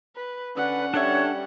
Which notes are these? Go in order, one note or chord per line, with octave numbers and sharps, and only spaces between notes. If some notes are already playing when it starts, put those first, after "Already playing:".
B4
D3 C#4 B4 F#5
G3 D4 A4 C#5 E5